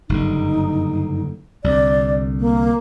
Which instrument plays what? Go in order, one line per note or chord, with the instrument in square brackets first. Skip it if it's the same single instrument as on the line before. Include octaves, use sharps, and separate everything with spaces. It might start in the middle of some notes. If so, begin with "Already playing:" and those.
[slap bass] F#1 G2 D3 [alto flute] D#4
[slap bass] C2 D3 [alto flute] D5
[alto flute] A#3